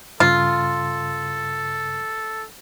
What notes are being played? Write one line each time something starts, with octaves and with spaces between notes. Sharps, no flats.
G2 C#3 F4 A4